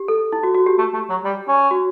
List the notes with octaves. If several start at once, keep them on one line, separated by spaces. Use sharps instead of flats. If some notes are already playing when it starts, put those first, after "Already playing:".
Already playing: G4
A4
E4
F#4
F#4
G4
A3
A3
F#3
G3
C#4
F#4